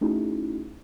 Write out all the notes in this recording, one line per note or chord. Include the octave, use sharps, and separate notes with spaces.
A3 C#4 D#4 E4 F#4 G#4